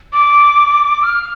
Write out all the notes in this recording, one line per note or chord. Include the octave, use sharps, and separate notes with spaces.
D6
F6